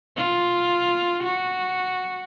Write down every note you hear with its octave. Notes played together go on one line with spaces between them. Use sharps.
F4
F#4